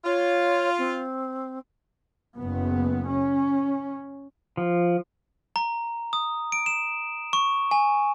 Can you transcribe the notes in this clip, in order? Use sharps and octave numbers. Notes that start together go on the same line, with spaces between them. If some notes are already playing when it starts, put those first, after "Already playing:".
F4 C#5
C4
F#1 B3
C#4
F3
A#5
D#6
D7
E7
C#6
G#5